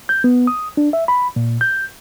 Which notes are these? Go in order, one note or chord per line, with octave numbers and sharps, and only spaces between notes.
G6
B3
D#6
D4
E5
B5
A#2
G6